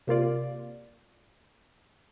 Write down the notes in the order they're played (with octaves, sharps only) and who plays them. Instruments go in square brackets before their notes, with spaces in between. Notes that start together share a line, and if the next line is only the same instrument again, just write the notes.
[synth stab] C3 A#3 F4 D5